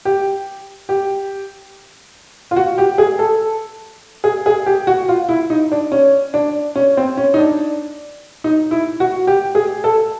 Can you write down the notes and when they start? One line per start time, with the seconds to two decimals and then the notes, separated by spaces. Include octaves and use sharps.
0.05 G4
0.89 G4
2.51 F4
2.56 F#4
2.78 G4
2.98 G#4
3.19 A4
4.24 G#4
4.46 G#4
4.66 G4
4.87 F#4
5.09 F4
5.29 E4
5.50 D#4
5.72 D4
5.92 C#4
6.34 D4
6.76 C#4
6.97 C4
7.17 C#4
7.34 D#4
7.38 D4
8.44 D#4
8.71 E4
9.00 F#4
9.27 G4
9.55 G#4
9.84 A4